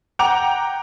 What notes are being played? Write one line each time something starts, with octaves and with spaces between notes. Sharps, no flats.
F#5 G5 A#5 D6 F7